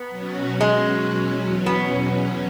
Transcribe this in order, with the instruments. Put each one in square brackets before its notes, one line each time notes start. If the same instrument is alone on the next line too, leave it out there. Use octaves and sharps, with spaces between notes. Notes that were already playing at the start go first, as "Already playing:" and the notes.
Already playing: [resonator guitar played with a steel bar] B3
[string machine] B2 F#3 C#4 F#4
[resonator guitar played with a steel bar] G#3
[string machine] E2 B2 F#3 C#4
[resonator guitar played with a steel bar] B3